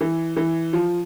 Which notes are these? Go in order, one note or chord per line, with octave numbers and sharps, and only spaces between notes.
E3
E3
F3